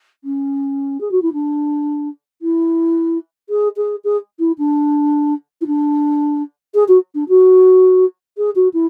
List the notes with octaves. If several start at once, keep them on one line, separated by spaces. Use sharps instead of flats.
C#4
G#4
F#4
E4
D4
E4
G#4
G#4
G#4
E4
D4
E4
D4
G#4
F#4
D4
F#4
G#4
F#4
E4